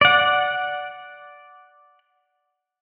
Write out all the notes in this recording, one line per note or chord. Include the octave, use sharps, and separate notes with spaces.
D5 F#5